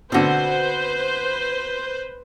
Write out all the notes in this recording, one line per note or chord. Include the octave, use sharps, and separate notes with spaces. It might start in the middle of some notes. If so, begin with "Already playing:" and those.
B2 D3 C4 F#4 B4 C5